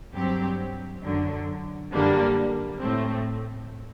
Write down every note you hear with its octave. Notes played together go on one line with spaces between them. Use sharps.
G2 F#3 C4 G4
F#2 D3 F#3
F#2 D3 G3 A#3 D4
A2 A3 C4